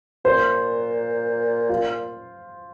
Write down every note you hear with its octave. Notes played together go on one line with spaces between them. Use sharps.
A#2 C5
F4